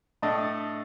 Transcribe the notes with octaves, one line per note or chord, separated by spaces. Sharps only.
A2 A3 D4 D#5